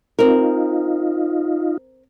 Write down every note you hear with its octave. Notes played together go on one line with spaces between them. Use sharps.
C4 D#4 F4 A#4